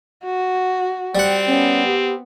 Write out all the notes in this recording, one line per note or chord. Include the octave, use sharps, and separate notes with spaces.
F#4
G3 C4 F#5
B3 C#4
G4